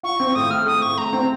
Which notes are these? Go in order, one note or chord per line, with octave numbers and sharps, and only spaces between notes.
F4 C#6
C4
A2 D#6
A3 F6
A3 D#6
A2 C#6
A3 A#5
C4